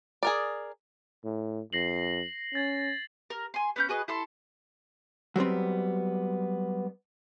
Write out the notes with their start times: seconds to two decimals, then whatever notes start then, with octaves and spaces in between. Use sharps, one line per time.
0.23 G#4 A#4 D5
1.25 A2
1.73 F2 A#6 C7 F#7
2.54 C#4 G#6 A6 F#7
3.30 A#4
3.54 G#5 C6
3.76 B3 C#4 G6
3.89 F#4 G#4 B4 D#5
4.08 E4 A4 C6
5.36 F#3 G3 B3 C4